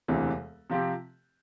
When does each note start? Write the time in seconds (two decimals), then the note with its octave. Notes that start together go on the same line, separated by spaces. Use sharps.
0.08 E1 D2 C3 E3
0.70 C3 F3 C4 G4